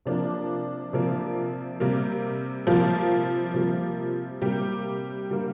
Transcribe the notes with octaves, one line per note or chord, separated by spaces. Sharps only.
C3 F3 A#3 D4
C3 F3 A#3
C3 G3 A#3
C3 F3 G3 A#3 F4
C3 G3 A#3
C3 G3 A#3 G4
D3 G3 A#3